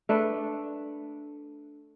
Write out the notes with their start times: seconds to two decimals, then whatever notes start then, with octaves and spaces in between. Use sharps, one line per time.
0.09 A3 D4 B4